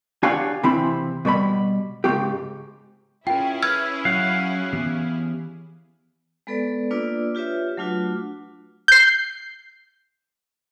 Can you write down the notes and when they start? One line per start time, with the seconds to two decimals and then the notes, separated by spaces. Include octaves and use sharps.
0.23 D4 G4 C#5 F5 F#5 G#5
0.63 C3 E3 C4 E4 B5
1.25 B2 G3 C#5 B5
2.04 G#2 C#3 A3 A#3 G4
3.27 C#4 E4 F4 G#4 A#4 G5
3.63 B4 E6 F6 G#6
4.05 F#3 F5 F#5
4.73 E3 B3 G4
6.47 G#3 B3 A4 B4 D5
6.91 A#3 D4 F4 B4 D5 E6
7.35 F4 G4 B4 C#5 E5
7.77 F#3 A3 D4 F4 F#4 B4
8.88 G6 C7